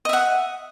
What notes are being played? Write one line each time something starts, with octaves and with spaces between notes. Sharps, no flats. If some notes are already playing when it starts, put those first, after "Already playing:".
D#5 E5 F#5